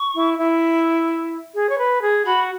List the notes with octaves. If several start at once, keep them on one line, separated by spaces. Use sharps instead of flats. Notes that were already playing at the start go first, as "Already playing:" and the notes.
Already playing: C#6
E4
E4
G#4
C#5
B4
G#4
F#4 B5